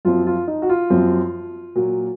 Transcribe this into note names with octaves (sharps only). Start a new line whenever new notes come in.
F#2 F3 C4 F4
F4
D#4
F#4
F4
F#2 F3 C4
A#2 F#3 A#3